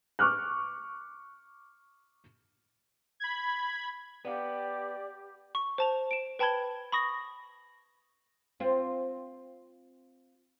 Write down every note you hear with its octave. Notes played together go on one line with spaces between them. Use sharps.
C#6 D6 F6 F#6
B5 G#6
B3 G4 D5 F5
C#6
C5 A5 F7
D7 E7
B4 G5 A5 B5 G#6 G7
B5 C#6 D#6 A#6
C4 F4